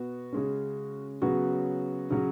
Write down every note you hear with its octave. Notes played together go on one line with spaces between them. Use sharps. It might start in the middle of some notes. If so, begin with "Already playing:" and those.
Already playing: B2 B3 F#4
C#3 G#3 C#4
C#3 F#3 B3 F#4
C#3 F#3 C#4